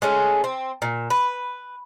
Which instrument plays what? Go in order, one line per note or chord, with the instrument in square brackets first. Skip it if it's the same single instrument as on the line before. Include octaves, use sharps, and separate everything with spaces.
[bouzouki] G#3 A3 C#4
C4
A#2
B4